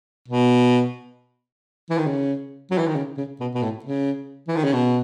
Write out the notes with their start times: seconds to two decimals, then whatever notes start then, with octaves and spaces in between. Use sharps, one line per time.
0.28 B2
1.90 E3
1.98 D#3
2.07 C#3
2.71 F#3
2.78 E3
2.87 D#3
2.96 C#3
3.17 C#3
3.40 B2
3.55 B2
3.63 A2
3.84 C#3
4.48 E3
4.57 D#3
4.64 C#3
4.73 B2